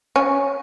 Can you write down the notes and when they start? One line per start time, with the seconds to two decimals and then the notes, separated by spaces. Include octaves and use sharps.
0.16 C#4